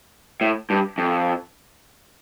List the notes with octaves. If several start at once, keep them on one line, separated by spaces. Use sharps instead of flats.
A2
G2
F2